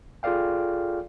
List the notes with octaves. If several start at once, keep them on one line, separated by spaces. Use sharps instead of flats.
F4 G#4 A4 D5 F5 G5